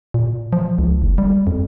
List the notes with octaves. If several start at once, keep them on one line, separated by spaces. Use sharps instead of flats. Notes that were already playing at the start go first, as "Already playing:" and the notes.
A#2
F3
C#2
F#1
G3
F2